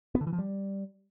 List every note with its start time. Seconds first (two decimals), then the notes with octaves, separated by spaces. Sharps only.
0.15 B3
0.21 D3
0.27 E3
0.33 F3
0.38 G3